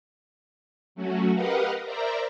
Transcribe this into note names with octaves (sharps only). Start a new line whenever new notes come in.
F#3 A3 C#4 F#4
G4 A#4 B4 D#5 F5 F#5
A#4 C5 D5 E5 A#5